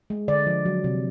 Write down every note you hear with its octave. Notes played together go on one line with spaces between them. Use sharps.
G#3
D3 D5
F3
F#3
C3